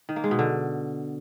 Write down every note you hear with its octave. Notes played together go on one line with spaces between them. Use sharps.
D#3
A#3
G#3
B2
D3